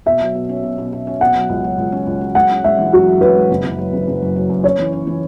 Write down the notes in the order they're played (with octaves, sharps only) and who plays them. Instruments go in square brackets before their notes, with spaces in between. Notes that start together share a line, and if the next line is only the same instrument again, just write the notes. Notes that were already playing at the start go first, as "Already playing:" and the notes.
[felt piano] B2 [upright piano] E5
[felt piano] F#3
B2
C#4
B2
B2
B2
C#4
[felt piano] B2 [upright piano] F#5
[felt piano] F#3
C#2
F#3
C#2
C#4
C#2
F#3
[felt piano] G#3 [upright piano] F#5
[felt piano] C#4
[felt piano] G#3 [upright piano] E5
[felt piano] E3
[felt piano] F#2 [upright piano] F#4
[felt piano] F#2
[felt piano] C#4 [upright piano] B4
[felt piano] G#3
F#1
F#1
F#3
F#1
F#1
F#2
F#3
F#2
[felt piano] C#4 [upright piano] C#5
[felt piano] E3
C#4
E3